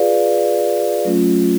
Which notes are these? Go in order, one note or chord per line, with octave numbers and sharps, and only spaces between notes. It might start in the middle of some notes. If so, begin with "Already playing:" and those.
Already playing: F4 G#4 B4 D5 F5
F#3 A3 C#4 F4